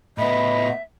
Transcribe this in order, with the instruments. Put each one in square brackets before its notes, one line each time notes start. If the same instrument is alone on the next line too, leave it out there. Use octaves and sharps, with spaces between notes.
[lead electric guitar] A2 B3 [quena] D#5 [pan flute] E5 [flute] B5